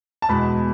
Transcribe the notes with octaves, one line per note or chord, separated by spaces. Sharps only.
A5
E2 B2 G#3 B5